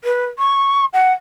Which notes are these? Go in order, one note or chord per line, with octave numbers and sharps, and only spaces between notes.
B4
C#6
F#5